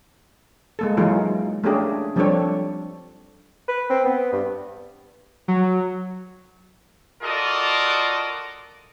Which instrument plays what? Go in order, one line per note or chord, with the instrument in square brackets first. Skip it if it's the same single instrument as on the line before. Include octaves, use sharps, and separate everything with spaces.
[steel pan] G#3 A#3 A4
E3 F#3 G#3 A#3 D#4 F4
A3 A#3 C#4 D4 G4 G#4
F3 G3 C4 D4 A4 C#5
[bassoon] B4
C4
B3
G2
[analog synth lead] F#3
[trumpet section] F4 F#4 A4 A#4 D5 D#5